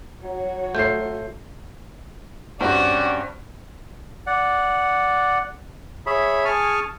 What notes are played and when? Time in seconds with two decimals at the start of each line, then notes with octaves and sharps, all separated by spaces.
0.24 F#3 F#4 C#5
0.75 A3 F4 A4 G6 C7
2.61 G2 C4 C#4 F#4 G4 B4 D5
4.27 D5 F#5
6.06 G#4 C#5 E5 B5
6.45 G#4 G#5 A5 C#6 F6